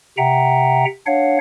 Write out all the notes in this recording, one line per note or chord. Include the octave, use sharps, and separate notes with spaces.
C3 E5 F#5 G5 A#5
D4 C#5 F5 F#5